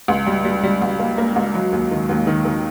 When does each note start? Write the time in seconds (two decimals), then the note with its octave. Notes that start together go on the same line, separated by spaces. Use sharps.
0.08 C#2
0.27 G3
0.45 G3
0.63 G3
0.82 C#2
0.99 A#3
1.18 A#3
1.36 C#2
1.55 F#3
1.72 D#2
1.91 D#3
2.09 D#2
2.27 D#3
2.45 D#3